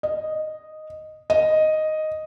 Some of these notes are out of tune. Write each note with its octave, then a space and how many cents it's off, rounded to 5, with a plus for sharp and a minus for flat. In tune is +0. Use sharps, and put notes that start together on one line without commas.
D#5 -5
D#5 +0